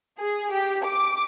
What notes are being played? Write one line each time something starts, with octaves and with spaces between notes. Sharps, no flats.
G#4
G4
D6